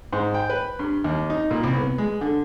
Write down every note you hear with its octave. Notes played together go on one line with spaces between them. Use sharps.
G#2
G5
B4
G2
D#2
D#4
A#2
C2
B3
G#3
D3